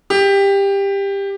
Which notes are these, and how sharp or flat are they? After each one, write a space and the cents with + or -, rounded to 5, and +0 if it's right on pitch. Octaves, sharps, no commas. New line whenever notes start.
G4 +15